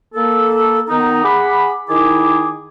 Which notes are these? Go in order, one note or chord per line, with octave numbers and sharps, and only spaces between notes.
A#3 A4
D#3 B3 D#4 A#5
G#4 F#5 B5 D6
D#3 E4 G#4 D6